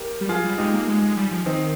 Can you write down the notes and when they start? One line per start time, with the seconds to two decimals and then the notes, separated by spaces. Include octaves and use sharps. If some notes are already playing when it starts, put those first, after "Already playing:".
Already playing: G4 A#4
0.21 G3
0.29 F3 F4 G#4
0.44 G3
0.58 G#3 D#4 G4
0.74 A#3
0.88 G#3
1.02 G#3
1.17 G3
1.31 F3
1.46 D#3 C4 D#4